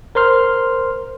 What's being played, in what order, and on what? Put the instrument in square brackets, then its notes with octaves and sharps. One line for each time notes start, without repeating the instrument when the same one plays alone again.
[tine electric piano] A#4 C5 C6 F6